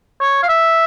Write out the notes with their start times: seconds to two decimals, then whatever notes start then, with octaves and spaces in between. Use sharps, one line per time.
0.20 C#5
0.43 F5
0.49 E5